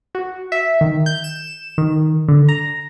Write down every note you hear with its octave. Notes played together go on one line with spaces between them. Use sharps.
F#4
E5
D#3
G6
E7
D#3
D3
A#5